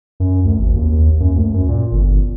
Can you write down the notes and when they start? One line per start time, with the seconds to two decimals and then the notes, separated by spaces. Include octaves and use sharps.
0.20 F#2
0.45 D2
0.59 G#1
0.76 D#2
1.20 F#2
1.36 D2
1.54 F#2
1.69 A#2
1.92 G1